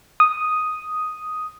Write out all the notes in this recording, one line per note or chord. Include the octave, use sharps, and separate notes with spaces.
D#6